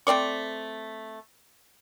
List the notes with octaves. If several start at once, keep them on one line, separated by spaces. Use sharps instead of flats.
A3 C4 D5 C#6